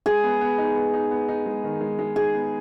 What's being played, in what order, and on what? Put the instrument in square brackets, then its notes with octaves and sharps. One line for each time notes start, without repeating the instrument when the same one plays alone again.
[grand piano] G#3 [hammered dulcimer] G#4
[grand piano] B3
B3
D#4
B3
D#4
B3
D#4
G#3
D#3
G#3
G#3
[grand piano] D#4 [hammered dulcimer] G#4
[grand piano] B3